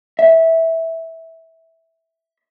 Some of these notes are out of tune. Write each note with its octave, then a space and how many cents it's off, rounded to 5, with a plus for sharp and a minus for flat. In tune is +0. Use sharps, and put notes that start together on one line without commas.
E5 -10